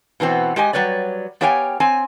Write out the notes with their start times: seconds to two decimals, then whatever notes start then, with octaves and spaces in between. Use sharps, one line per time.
0.20 B2 E3 B3 C4
0.56 G#3 G4 D#5 G#5
0.73 F#3 G3 B4 C#5 D5
1.41 B3 G4 C#5 F5 G5 G#5
1.80 C4 G#5